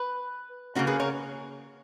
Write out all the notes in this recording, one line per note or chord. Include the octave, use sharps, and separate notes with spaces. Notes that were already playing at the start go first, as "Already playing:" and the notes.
Already playing: B4
C#3 F3 A#3 C#4 F#4 A#4
G#4 B4
A#4 C#5